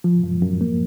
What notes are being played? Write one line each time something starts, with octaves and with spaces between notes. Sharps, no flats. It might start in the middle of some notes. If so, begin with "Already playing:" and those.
F3
F#2
F#2
A#3